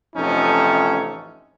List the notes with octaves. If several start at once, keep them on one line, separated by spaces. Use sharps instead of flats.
A1 F2 C3 C#4 D#4 A4